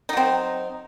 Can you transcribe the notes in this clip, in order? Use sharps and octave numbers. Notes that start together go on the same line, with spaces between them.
F#3 C4 D#4